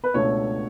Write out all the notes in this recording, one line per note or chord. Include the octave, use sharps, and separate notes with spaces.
B4
C#2 B2 A3 D4 C#5